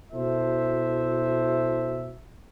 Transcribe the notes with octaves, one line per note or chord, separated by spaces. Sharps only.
B2 E4 F#4 A4 C5 E5